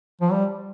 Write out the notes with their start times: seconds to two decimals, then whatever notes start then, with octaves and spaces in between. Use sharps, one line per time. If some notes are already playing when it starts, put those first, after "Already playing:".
0.21 F3
0.31 G3